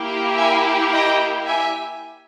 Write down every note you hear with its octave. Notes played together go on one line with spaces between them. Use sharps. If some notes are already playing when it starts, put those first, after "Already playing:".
Already playing: A#3 E4 G4
E5 G#5
D#5 G5
E5 G#5